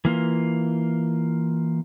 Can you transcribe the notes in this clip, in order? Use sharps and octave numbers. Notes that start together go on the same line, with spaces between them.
E3 A#3 F4